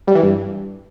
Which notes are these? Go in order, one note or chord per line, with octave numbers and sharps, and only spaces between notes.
G3
E3
G2